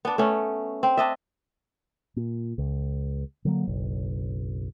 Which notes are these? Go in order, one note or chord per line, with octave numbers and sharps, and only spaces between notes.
B3 D4
A3 B3 C#4
C4
D4 D#5 E5
A#2
C#2
D3 F#3 A#3
F#1 B1